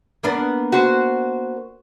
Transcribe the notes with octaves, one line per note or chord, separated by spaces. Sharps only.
A#3 B3 D4
F#4 C5